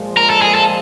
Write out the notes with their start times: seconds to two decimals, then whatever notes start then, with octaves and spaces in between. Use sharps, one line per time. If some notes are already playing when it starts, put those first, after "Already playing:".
Already playing: A#2 F3 G#3
0.17 A#4
0.30 A4
0.42 G#4
0.55 A4